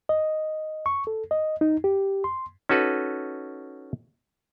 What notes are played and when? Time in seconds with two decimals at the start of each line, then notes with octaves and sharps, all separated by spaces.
0.09 D#5
0.86 C#6
1.07 A4
1.31 D#5
1.61 D#4
1.84 G4
2.24 C6
2.69 C#4 D#4 F#4 A4 B4